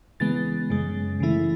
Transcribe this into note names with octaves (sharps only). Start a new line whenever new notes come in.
C#3 E3 G#3 B3 A6
F#2 C#3 G#3
C#3 E3 A3 E4